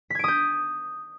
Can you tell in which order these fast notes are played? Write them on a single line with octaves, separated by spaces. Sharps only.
B6 G#6 D7 D#6 G6